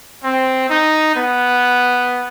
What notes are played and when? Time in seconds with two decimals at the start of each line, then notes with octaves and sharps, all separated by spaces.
0.23 C4
0.69 D#4
1.15 B3